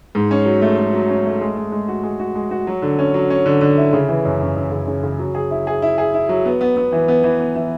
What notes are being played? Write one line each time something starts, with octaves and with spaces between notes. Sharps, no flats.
G#2
C#4
F#3
A3
A3
F#3
C#4
A3
G#3
G#3
G#3
F#4
G#3
F#4
G#3
F#4
F#3
D3
C#4
F#3
C#4
D3
D3
E4
C#3
E3
F#2
F#2
F#2
C#3
C#3
C#3
F#3
G#4
E4
G#4
E4
G#4
E4
F#3
B3
B3
B3
E3
B3
E3
B3
E3